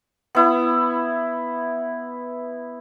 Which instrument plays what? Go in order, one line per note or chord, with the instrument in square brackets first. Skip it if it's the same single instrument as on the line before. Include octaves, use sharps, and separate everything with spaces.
[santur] B3 E4